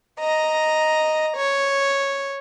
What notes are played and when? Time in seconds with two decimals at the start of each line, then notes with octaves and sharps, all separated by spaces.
0.20 D#5 A#5
1.37 C#5